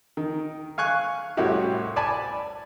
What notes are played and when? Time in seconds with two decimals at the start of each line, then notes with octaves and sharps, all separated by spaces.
0.17 D#3
0.78 F5 G#5 C#6 F#6
1.37 C2 A2 C#4 E4 F#4 G4
1.96 D5 G#5 A5 B5